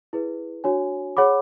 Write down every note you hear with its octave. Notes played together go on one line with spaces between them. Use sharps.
E4 G#4 B4
D4 F#4 C#5 G#5
G#4 C#5 F#5 B5 D6